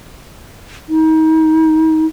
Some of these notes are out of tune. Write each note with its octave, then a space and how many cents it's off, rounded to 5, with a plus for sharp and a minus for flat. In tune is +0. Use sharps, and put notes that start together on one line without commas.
D#4 +30